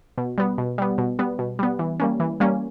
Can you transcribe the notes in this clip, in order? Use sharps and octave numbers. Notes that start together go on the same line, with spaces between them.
B2
G3 B3
B2
G3 B3
B2
G3 B3
B2
G3 B3
E3
G3 A#3 C#4
E3
G3 A#3 C#4